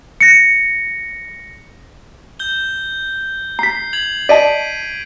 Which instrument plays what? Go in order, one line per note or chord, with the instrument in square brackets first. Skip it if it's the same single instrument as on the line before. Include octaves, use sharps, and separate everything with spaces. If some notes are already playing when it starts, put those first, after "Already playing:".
[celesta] A#6 C#7
[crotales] G6 G7
[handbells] A#5 B6 [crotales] C7
[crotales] G#6 F7 F#7
[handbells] D5 D#5 A5 [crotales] B6 D7 D#7